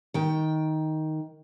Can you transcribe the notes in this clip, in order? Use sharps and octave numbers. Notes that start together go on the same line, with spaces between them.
D#3 G5